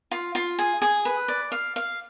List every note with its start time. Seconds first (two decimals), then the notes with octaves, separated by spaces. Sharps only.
0.11 F4
0.35 F4
0.59 G#4
0.82 G#4
1.05 B4
1.28 D5
1.52 F5
1.76 F5